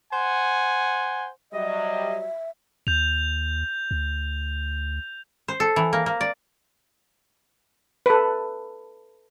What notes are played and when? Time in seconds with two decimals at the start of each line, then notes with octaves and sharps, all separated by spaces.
0.13 C5 F#5 G#5
1.53 F#3 G3 D#5 E5
2.87 D#2 G6 F7
3.91 D2
5.48 C5
5.60 A4
5.76 E3
5.93 A#3
6.06 A#3
6.21 D5
8.06 A4 B4